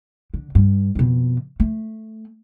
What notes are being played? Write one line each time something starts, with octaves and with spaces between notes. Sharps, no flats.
D3
G2
F2 B2
A3